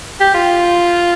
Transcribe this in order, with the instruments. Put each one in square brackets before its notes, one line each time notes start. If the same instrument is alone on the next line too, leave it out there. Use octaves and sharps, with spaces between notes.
[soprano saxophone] G4
F4